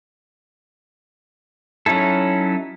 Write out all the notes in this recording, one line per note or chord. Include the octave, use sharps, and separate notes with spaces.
F#3 C#4 D#4 E4 A4